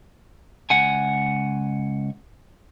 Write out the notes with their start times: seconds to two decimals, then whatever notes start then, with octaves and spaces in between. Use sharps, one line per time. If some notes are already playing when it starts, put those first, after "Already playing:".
0.70 C#2 F#5 G#5